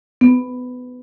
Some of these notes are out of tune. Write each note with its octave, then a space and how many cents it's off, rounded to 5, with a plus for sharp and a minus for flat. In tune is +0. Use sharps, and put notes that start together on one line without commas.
B3 +20